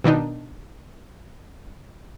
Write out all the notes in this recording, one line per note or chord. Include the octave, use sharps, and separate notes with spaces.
B2 D#3 D4 D#4